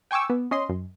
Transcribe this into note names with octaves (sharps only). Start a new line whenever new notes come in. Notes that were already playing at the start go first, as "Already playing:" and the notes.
G5 G#5 C#6 D6 E6
B3
C#4 D#5 C6
F#2